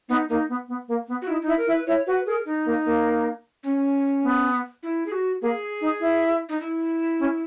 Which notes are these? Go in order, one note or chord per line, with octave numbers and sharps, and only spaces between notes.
B3 D#4
A#3 D#4
B3
B3
A#3
B3
F#4
D#4 E4
D#4 E4
A#4
E4
B4
E4 C#5
F#4 B4
G#4 A#4
D#4
A#3
A#3
C#4
B3
E4
G#4
F#4
A#3 G#4
D#4
E4
D#4
E4
C#4